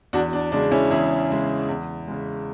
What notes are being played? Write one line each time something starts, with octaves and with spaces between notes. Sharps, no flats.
E2 D4 F#4
D4
C#3 G#3 D4
C#4 E4
E2 E4 G#4
C#3 G#3
E2
C#3 G#3